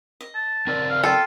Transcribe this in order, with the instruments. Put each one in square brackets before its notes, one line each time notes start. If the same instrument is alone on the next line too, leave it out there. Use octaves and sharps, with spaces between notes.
[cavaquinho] D#5
[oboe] A5
[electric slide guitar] C4 A#4 D5
[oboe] F5
[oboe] F4 [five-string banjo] A4 [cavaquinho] G5